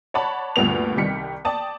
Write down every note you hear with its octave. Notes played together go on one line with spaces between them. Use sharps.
C#5 D5 F#5 A5 B5
D2 G2 A#2 B3 F7
C2 D#3 G3 G4 B6 C#7
D5 G5 A5 D#6